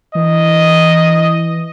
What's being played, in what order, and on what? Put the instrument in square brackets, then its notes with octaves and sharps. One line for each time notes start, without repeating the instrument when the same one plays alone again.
[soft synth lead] E3 [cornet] D#5